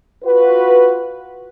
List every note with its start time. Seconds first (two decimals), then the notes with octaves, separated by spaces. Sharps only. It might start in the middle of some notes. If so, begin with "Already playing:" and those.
0.24 F4 F#4 B4